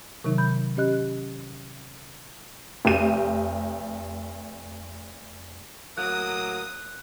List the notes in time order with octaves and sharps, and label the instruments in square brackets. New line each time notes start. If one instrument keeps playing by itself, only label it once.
[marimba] C3 D#3 F#3 D#4
B5 G6
C#4 G4 D#5 F#6
[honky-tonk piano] F1 G4 D#7
[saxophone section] A2 F#3 A#3 [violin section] D#6 [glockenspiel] F#6